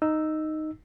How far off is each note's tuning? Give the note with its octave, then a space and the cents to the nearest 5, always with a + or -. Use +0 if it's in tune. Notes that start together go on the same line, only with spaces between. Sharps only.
D#4 +0 E6 +0